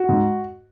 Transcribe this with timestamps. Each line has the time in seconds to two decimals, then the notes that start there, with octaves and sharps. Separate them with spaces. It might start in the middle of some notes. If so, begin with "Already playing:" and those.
Already playing: F#4
0.09 G#2